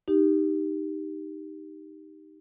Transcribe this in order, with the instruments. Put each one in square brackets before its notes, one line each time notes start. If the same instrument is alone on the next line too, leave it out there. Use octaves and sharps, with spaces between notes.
[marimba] D#4 G4